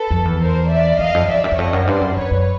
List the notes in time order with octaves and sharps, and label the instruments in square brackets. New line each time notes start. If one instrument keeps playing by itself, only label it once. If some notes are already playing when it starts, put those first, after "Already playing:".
Already playing: [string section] A4 B4
[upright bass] F2
E2
[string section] A#4 C5
D5 E5
[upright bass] E2 [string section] D#5 F5
[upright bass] F2
[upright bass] F2 [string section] D5 E5
[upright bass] F#2
E2
[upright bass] F2 [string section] C#5 D#5
[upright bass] F#2
[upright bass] G2 [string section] C5 D5
[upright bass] F#2
[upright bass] F2 [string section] B4 C#5
[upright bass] F#2